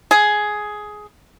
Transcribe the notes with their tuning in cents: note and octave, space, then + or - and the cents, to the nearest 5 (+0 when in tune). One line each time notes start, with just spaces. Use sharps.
G#4 +10